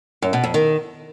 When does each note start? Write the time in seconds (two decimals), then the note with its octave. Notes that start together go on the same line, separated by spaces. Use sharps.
0.22 F#2
0.33 B2
0.44 F2
0.54 D#3